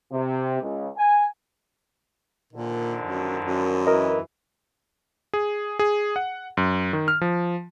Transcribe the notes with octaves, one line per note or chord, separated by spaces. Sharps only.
C3
C#2
G#5
A#1 A#2 D3 D#3
F#2
F#2
D2 E3 A#4 D#5
G#4
G#4
F#5
F#2
D#3
F6
F3